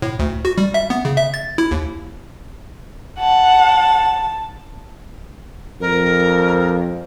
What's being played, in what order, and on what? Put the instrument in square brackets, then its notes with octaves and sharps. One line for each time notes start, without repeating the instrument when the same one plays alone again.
[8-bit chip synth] A2
D2
F#4
G3
E5
B3
C#3
E5
A6
E4
D#2
[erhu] F#5 [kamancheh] A5
[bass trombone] F2 [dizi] A#4